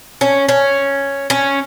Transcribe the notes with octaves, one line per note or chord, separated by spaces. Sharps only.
C#4
C#4
C#4